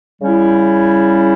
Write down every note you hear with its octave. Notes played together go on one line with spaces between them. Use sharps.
C#3 G3 C#4 E4